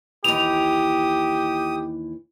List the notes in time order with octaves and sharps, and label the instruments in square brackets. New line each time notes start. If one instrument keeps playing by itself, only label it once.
[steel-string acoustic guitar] D#2 E3 [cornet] G4 [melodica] D#6 [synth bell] F7